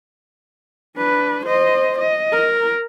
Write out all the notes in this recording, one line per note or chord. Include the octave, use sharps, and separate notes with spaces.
D4 B4
C5 D#5
D#5
A#4